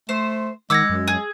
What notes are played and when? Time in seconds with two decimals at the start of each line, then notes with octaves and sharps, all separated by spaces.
0.09 A3 C5
0.70 D#3 G#3 F#5 D6 E6 G#6 A#6
0.90 F#2
1.08 G#4